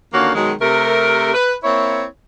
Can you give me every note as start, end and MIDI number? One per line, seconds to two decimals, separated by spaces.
0.13 0.34 39
0.13 0.34 50
0.13 0.34 58
0.13 0.34 61
0.13 0.34 66
0.13 0.34 77
0.35 0.52 47
0.35 0.52 51
0.35 0.52 54
0.35 0.52 56
0.61 1.33 48
0.61 1.33 57
0.61 1.33 70
1.34 1.53 71
1.64 2.04 58
1.64 2.04 60
1.64 2.04 64
1.64 2.04 73